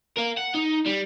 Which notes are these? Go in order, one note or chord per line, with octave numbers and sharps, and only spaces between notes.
A#4 F5
F#5
D#4
G3